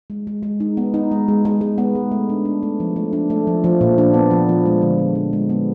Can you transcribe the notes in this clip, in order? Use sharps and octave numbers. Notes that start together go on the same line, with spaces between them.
G#3
G#3
G#3
D#4
B3
D#4
G#3
G#3
G#3
G#3
B3
G#3
A3
D4
D4
A3
F3
A3
D4
A3
F3
F3
A#2
D4
B3
F3
F3
G#3
D3
B3
F3
G#3
B3